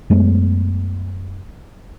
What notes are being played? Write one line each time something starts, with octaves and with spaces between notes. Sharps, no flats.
F#2 G#3 A3 B3